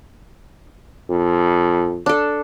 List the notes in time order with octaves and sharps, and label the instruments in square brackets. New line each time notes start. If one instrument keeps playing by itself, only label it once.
[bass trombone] F2
[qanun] D4 A4